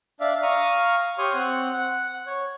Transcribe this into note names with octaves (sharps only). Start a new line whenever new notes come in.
D4 D5 E5 F5
F5 A#5 C#6 D#6 F6
G4 C#5 C6 C#6 D#6 F6
C4 F#5
F#5
C#5